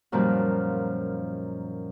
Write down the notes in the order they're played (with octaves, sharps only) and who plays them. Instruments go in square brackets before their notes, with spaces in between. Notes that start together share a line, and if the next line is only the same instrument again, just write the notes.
[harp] F#2 A#2 D#3 F3 G3